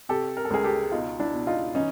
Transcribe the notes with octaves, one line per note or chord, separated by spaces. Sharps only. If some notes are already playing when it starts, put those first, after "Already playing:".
C3 G4 A4
A#4
A4
C#2 G#4 A#4
G4 A4
B2 D#4 F4
D4 E4
B2
D#4 F4
E3 C#4 D#4